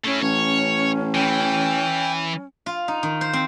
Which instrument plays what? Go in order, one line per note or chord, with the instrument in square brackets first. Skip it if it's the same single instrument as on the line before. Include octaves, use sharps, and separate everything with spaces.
[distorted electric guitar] A3 E4 [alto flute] C#4
[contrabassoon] A1 [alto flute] C#4 [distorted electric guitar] C#5
[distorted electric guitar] E3 [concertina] G5
[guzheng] F4
D#4
D#3
C5
C4